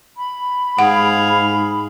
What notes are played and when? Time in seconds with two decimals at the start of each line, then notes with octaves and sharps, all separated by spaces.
0.17 B5
0.79 G#2 G#4 F5 F#5